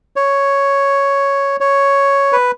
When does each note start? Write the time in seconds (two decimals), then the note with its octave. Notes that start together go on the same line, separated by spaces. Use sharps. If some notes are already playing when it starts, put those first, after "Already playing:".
0.16 C#5
1.60 C#5
2.32 B4